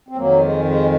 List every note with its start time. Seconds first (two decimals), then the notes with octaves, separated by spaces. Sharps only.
0.08 C4
0.16 F2 D#3 F#3 A#3
0.40 G#3
0.64 G#3